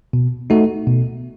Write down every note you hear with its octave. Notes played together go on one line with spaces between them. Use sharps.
B2
A3 D#4 F#4
B2